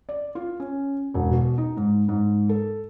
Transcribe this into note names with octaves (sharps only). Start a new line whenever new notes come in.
D5
F4
C#4
E1
B2
D#4
G#2
G#2
A4